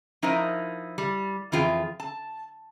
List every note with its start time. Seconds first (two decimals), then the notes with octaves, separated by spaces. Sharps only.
0.22 F3 D#4 E4 A#4 C5 D#5
0.98 G3
1.52 F2 E3 F4 G#4 G5
2.00 A5